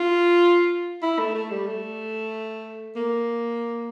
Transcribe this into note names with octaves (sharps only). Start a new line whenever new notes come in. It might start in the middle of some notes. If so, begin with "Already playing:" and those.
Already playing: F4
E4
A3
A3
G3
A3
A#3